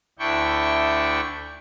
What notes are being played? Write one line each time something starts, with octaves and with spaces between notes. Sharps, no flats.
D2 D4 E4 G5 C#6